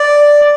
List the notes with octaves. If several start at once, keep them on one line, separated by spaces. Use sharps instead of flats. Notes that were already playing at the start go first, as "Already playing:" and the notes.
Already playing: D5